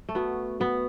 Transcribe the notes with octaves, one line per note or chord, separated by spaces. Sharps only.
A3
B3 F#4
B3 F#4